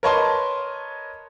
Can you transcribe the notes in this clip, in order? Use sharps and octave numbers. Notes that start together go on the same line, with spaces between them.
A#4 B4 C#5 D#5 A5 C6